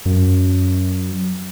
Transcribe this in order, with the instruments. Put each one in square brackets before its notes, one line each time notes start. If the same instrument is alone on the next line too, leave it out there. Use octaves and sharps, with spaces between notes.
[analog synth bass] F#2